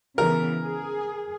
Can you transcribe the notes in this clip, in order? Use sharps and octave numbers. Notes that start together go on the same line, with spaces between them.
C#3 E3 B3 A#4
G#4